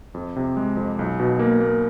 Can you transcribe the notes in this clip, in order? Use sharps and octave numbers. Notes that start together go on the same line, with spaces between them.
F2
C3
G#3
F2
B1
B2
A#3
A#3